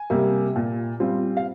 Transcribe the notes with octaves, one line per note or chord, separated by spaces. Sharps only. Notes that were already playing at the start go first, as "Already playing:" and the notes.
Already playing: G#5
C3 G3 A#3
A#2
G3 C4 F4
F5